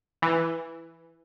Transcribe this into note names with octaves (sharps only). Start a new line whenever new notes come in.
E3